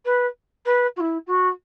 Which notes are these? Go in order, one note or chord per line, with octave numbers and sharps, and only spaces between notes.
B4
B4
F#4
E4
F#4